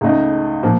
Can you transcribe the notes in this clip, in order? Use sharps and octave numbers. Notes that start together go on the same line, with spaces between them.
C#2 C#3 A3 D#4
A#2 F3 A#3